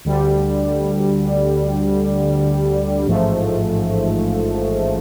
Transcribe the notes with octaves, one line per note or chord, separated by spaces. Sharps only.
D2 D3 G3
A1 G#2 F3 A3